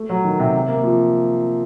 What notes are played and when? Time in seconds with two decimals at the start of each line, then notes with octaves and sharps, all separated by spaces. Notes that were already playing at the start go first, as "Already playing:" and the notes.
Already playing: A3
0.10 F#3
0.25 D#3
0.39 C3
0.53 C3
0.68 A#3
0.84 F3